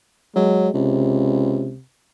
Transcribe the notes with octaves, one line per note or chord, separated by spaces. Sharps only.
F#3 G#3
C#2 C3